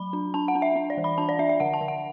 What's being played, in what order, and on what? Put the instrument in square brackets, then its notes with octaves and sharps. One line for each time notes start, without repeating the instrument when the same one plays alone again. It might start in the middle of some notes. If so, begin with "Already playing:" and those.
Already playing: [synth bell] F#3 B5
D4
D4 A5
F#5
D4
E5
D4
D5
E3
B5
D4 A5
D5
D4 E5
E5
D3 F#5
A5
D3
F#5